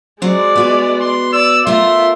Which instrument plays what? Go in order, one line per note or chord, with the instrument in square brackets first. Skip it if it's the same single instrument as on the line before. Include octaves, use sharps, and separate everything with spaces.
[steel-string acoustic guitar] F#3 C4 [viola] G#3 D5
[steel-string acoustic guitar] B3 F#4
[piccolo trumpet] C6
[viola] D5 [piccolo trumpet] E6
[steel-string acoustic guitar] A3 A#4 [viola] F4 [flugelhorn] E5 [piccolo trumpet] C6